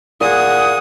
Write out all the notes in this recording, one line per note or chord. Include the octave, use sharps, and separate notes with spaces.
A#2 G#4 F#5 D#6